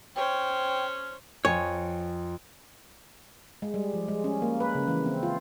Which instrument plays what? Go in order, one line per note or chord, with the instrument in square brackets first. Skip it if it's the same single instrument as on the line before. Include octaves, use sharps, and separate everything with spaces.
[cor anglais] C#4 [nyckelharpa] C5 C#5 [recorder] G5
[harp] F2 G#5 [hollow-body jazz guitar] C#5
[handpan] G#3
G3
F3
G#3
C#4
A#3
B4
C#3
E3
C4
F4